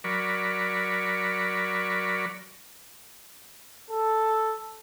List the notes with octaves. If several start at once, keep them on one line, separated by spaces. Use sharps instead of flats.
F#3 A#4 D5 B5 C#6
A4